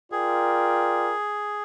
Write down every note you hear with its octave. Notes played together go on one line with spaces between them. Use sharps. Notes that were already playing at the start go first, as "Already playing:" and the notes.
F4 G#4 A#4 D5 G5